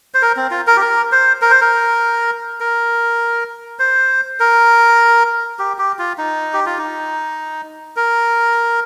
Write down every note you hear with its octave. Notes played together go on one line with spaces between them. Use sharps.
C5
A#4
C4
F4
A#4
G4
A#4
C5
A#4
C5
A#4
A#4
C5
A#4
G4
G4
F4
D#4
G4
F4
D#4
A#4